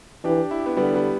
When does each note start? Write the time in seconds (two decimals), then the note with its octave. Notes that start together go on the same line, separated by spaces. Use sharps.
0.24 E3 D4 G4
0.51 E4
0.59 G4
0.66 B3 E4
0.77 D3 G3 B3
0.94 G3 B3